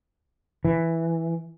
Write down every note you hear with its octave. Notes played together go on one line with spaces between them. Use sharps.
E3